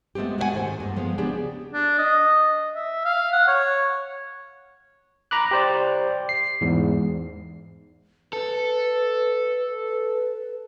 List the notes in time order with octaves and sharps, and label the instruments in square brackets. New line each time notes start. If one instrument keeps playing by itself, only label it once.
[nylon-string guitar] G#3 A3 B3 C4 G4
F#4 A#4 C5 E5 F#5 G#5
G#2 D#3 A3 G#4 C5
G2 A#3
F3 G#3 B3
C#3 B3 C4 D4 G4 G#4
[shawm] D4
D#5
E5
F5
F#5
C#5
[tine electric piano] A#5 B5 D6 F#6
G4 C5 D5
C7
E2 G#2
[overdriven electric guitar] A4 [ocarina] B4
[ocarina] B4